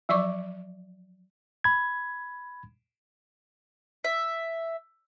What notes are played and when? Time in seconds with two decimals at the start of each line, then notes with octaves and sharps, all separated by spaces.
0.09 F3 F#3 D5 C#6 D6
1.64 B5 G#6
4.04 E5